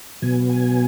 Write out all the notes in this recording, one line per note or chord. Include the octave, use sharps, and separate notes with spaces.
B2 F#3 B3 G#5
G#5